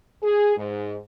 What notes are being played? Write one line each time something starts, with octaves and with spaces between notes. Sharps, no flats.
G#4
G#2